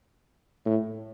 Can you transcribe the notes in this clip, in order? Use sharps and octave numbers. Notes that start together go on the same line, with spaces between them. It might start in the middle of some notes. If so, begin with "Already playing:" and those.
A2